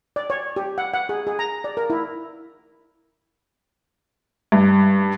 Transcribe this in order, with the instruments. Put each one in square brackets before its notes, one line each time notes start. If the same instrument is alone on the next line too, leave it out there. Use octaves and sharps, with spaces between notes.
[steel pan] D5
C#5
G4
F#5
F#5
G#4
G#4
A#5
D5
A#4
E4
[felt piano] G2